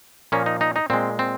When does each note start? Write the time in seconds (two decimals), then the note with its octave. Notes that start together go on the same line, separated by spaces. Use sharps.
0.32 A#2 F3 A#3 C#4
0.46 D#4
0.61 D#4
0.76 D#4
0.90 A#2 G#3 C4
1.19 C4